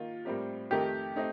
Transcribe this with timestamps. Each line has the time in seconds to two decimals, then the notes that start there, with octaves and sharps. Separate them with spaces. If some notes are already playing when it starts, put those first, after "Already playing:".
Already playing: D#3 A#3 F4
0.25 A2 G3 C4 G4 A#4
0.71 F2 D#3 A3 D#4 G4 A#4
1.16 A3 C4 D#4